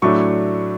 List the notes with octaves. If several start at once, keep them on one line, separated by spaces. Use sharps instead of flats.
A2 F#3 A3 D4 C#6